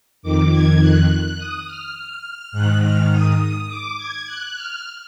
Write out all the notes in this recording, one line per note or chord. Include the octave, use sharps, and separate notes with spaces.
F2 D#3 D6
G#6
F#6
D#6
F6
G#2 D#3 F#6
F6
D#6
D6
G#6
F#6
F6